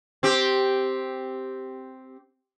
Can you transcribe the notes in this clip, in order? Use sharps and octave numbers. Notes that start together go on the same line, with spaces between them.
C4 G4